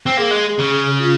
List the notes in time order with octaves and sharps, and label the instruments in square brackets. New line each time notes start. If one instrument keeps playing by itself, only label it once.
[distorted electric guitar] C4
[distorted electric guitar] A#3 [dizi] G#4
[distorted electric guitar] G#3
C#3
[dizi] F4